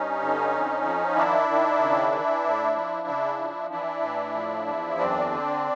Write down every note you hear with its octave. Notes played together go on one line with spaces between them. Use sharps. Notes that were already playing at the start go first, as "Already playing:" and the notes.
Already playing: G2 C#4 D#4
D3
F2
F3
D#3 D4 E4
D#3
C#3
E3
A2
F3
C#3
F3
E3 D4 E4
A2
F3
E2
F#2 C4 D4
D3